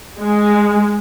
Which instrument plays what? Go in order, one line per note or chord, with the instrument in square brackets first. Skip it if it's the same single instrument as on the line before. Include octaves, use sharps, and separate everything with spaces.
[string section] G#3